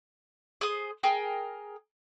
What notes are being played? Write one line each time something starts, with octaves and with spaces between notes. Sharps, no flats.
G#4 C5 D#6
G#4 A#4 G5